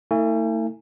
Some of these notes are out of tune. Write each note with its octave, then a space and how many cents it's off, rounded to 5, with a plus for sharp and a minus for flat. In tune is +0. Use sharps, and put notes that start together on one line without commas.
A3 +40 E4 -40 G#5 -15